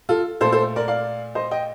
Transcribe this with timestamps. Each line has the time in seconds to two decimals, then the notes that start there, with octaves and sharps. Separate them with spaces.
0.09 F4 A4
0.41 A#2 A3 A4 C5
0.52 A4 C5
0.76 A#4 D5
0.88 D5 F5
1.35 C5 D#5
1.51 D#5 G5